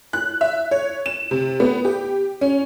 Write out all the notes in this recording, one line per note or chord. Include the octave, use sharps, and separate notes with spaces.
F#6
E5
C#5
E7
C3
B3
G4
C#4